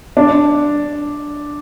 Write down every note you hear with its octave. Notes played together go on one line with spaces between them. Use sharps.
D4